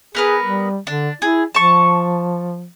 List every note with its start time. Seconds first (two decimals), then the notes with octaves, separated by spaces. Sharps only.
0.15 B3 G#4 A#4 B4
0.43 G3
0.87 D3 D4
1.22 E4 G#4
1.55 F3 A5 C#6